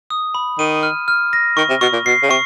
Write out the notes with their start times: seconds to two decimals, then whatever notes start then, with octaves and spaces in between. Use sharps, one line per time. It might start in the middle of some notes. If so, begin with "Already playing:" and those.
0.10 D#6
0.35 B5
0.59 D#3 D#7
0.83 F6
1.08 F6
1.33 A#6
1.57 D#3 C#6
1.70 C3
1.81 B2 C#6
1.93 A#2
2.06 B2 C7
2.23 C#3
2.30 C3 C#6